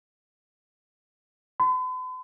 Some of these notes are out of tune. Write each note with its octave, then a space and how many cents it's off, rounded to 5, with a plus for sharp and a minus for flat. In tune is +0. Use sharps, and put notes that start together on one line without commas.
B5 +45